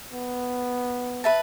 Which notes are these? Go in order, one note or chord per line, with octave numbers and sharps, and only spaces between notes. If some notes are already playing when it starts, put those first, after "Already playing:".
B3
B4 E5 A5